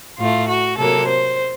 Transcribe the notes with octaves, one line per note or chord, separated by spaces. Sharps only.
A2 A3 F4
F#4
C3 F#3 A#3 A4
C5